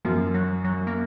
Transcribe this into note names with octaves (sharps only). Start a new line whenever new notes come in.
F#2 F3
F#3
F#3
A#3